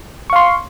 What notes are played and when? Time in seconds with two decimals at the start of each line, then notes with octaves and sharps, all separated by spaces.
0.30 C#6
0.33 F5
0.36 C6